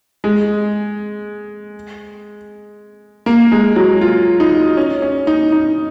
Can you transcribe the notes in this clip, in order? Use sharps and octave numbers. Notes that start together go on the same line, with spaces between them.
G#3
A#3
G#3
F#3
F4
D#4
C#4
C#4
D#4
D#4